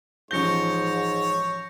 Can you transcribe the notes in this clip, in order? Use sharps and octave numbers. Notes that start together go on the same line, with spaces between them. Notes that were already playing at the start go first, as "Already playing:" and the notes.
A1 G#2 F3 C#5 G6 A#6 C#7 G7